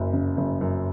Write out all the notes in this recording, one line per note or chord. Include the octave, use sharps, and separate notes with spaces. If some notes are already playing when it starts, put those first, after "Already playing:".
Already playing: F#1 F#2
C#3
F#1
F#2